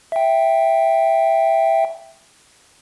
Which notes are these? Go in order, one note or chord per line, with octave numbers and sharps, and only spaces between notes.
E5 G5